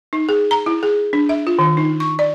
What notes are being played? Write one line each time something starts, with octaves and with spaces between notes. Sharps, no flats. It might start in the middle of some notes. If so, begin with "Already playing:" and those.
D#4
G#4
A#5
E4
G#4
D4
E5
F4
D#3
D#4
C#6
D5